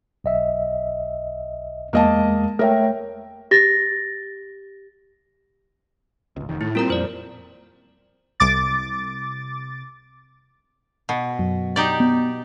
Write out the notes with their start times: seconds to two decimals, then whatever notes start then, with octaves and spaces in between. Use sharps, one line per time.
0.24 B1 D#5 E5
1.93 E2 G#3 A#3 D#5 A5
2.59 A3 A#4 C#5 E5 G5
3.51 G4 A6 A#6
6.36 G#1 C#2
6.49 F1 D#3
6.61 A2 E4
6.75 A#2 G3 C4 F4 A#4 A#5
6.90 F2 C5 D5
8.40 C2 D6 A6
11.09 B2
11.39 F#2
11.76 D#4 G4 D5
12.00 B3